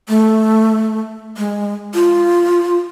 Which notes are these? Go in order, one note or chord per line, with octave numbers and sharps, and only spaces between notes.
A3
G#3
F4